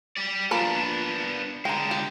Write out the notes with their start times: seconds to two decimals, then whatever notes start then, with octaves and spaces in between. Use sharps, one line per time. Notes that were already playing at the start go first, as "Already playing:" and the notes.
0.17 G4 D5
0.51 F3 A#3 B3 D4 B5
1.65 D3 G#3 G5 A#5
1.91 G4